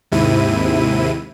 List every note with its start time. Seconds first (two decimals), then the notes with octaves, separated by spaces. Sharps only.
0.12 D#2 G#2 C3 E4 D#7